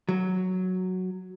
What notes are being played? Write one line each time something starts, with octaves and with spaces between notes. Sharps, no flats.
F#3